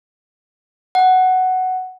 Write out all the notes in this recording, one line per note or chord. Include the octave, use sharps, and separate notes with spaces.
F#5